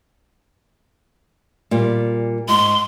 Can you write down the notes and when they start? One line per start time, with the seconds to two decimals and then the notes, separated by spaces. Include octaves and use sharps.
1.71 A#2 G3
2.48 G#2 C6